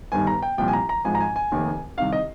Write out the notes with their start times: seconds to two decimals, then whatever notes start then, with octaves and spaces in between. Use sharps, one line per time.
0.12 G1 G2 D#3 G#5
0.27 A#5
0.43 G5
0.58 C2 A#2 F3 G5
0.68 G#5
0.73 A#5
0.89 A#5
1.04 G#1 G#2 F3 G#5
1.15 A#5
1.20 G#5
1.36 G#5
1.52 F1 D#2 D#3
1.97 C2 C3 D#3 F5
2.12 D#5